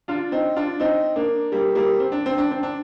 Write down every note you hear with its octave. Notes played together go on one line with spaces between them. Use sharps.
D4 F4
C4 D#4
D4 F4
C4 D#4
A#3 D4
G3 A#3
G3 A#3
C4
D4
C4
D4
C4
D4